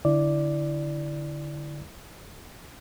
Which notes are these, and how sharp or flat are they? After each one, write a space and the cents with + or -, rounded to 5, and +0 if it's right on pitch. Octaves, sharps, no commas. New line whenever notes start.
D3 -10 E4 +0 D5 +0